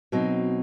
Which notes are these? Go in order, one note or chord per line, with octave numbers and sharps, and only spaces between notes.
B2 F#3 C4 D#4